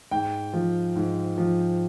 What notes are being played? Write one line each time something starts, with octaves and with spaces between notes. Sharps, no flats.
G#2 G5
F3
G#2
F3